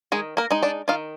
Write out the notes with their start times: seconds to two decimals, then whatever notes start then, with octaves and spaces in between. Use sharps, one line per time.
0.12 D#3 G#3 G#4
0.37 A#3 A#4
0.51 G#3 D#4
0.63 D4 D5
0.88 D#3 F4 F5